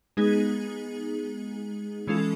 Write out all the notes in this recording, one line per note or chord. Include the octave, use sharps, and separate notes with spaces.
G#3 B3 D#4 G#4
E3 G#3 C#4 F4 A4